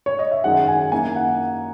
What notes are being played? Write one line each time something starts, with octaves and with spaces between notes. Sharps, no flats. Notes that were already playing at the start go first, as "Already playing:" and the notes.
C#5
D#5
E5
G#1 F#2 D#3 G#3 F#5
G#5
F#2 D#3 A#3 E4 G#5
F#5